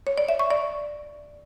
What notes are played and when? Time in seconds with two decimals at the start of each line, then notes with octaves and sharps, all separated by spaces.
0.07 C#5
0.18 D5
0.29 E5
0.39 C#6
0.50 D5